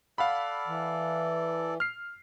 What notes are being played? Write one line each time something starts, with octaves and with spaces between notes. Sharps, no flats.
A4 D5 F5 F#5 B5
E3
F6 C7